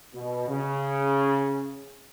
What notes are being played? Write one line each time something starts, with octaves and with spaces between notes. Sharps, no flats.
B2
C#3